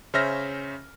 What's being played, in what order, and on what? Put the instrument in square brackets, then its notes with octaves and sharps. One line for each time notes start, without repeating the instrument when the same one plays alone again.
[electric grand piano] C#3 C#4 C5 E5 F6 A#6